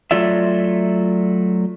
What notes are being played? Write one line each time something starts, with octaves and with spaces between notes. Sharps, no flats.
F#3 A3 F4 D5 E5